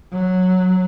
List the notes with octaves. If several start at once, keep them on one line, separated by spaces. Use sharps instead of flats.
F#3